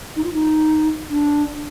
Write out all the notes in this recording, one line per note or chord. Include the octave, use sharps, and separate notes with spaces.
D#4
F4
D#4
D4